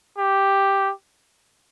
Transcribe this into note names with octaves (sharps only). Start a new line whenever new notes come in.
G4